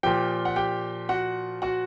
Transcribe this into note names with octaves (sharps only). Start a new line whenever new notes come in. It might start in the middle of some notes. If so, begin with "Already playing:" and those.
A#2 F3 G4 G5
F#5
G4 G5
F#4 F#5
F#4 F#5